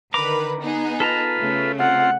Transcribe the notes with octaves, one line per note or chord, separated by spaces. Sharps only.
D3 D#3 B4 A#5 D6
B3 D#4 G#4
F4 A4 B4 A5 A#5
C#3 A3
C4 F4 F#5